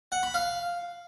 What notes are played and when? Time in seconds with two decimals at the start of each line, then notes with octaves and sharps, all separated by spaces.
0.12 F#5
0.23 B5
0.34 F5